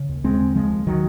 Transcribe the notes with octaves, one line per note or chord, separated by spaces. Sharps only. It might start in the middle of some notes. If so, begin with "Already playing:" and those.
Already playing: C#3
D#2
D#2 G#3 C4
C#3
C#3 F3 G#3
D#2
D#3 F#3